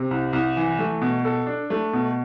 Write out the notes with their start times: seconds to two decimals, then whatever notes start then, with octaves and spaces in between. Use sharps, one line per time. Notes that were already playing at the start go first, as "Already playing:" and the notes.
Already playing: C3
0.11 C2
0.33 C2
0.57 E3
0.79 A3
1.02 B2
1.25 A4
1.47 D4
1.70 A3
1.93 B2